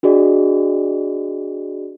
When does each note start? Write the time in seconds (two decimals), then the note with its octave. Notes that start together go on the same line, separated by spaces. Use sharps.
0.03 D4 F#4 G#4 D5 D#5